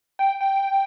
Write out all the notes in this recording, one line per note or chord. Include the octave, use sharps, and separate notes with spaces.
G5
G5